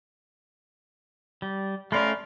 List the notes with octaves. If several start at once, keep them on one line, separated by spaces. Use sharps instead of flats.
G3
A3 C#4 A#4 D5 F5 B5 C6